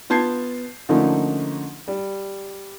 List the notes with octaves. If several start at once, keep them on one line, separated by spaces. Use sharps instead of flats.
B3 F4 A5 G6 G#6 C7
D3 F3 A3 A#3 C#4 D#4
G3